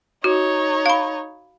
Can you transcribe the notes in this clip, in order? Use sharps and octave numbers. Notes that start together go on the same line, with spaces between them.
D#4 F#4 C#5
F5 B5